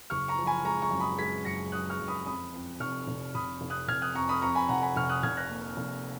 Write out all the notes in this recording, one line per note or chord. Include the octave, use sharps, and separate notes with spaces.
F#1 C#6 F6
A#5 C#6
F3
G#5 B5
G#3 A#5 C#6
A#5 C#6
F#2
B5 D#6
G#3 G#6 B6
F#2 A#6 C#7
F#2 D#6 F#6
C#6 F6
F#2
B5 D#6
F2 B5 D#6
F2
F1 C#6 F6
F1
F1 B5 D#6
F1
D#6 F#6
F1 F6 G#6
D#6 F#6
F2 A#5 C#6
B5 D#6
F2 A#5 C#6
G#5 B5
F1 F#5 A#5
G#5 B5
F1 C#6 F6
D#6 F#6
F1 F6 G#6
F#6 A#6
A#3
F1